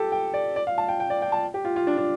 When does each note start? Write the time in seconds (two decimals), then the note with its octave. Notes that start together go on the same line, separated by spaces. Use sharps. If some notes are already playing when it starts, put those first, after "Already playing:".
Already playing: G4 A4
0.12 G5
0.34 D5
0.56 D5
0.67 F5
0.78 A5
0.88 G5
1.00 G5
1.10 D5
1.22 G5
1.32 A5
1.54 G4
1.65 F4
1.76 F4
1.87 D4
1.98 D4